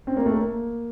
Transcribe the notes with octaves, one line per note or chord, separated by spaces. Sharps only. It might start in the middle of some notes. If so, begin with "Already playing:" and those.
C4
A#3
A3
A#3